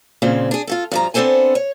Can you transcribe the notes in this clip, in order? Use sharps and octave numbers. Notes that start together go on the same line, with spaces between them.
A#2 C#3 F3 C4
D4 G#4
F4 F#4 A4
G2 F3 A#5
B3 C4 D4 A4 C5 G#5
C#5